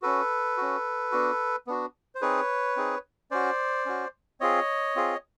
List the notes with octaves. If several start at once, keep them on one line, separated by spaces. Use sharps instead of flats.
C#4 F#4 A4 B4
C#4 F#4
B3 D4 F#4
B3 D4 F#4
C5
C4 D#4 G#4 B4 C#5
C4 D#4 G#4
C#4 F#4 C5 D5
C#4 F#4
C4 F4 G#4 C#5 D#5
C4 F4 G#4